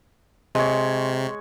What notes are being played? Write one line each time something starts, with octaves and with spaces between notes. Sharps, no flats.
C3 G#3 C#5